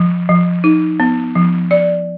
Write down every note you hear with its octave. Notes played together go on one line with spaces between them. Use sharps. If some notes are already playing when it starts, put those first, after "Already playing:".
Already playing: F3
F3
D#4
B3
F3
D5